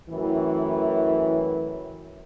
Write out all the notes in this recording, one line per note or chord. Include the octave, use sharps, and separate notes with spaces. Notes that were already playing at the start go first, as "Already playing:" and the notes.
F#2 A2 E3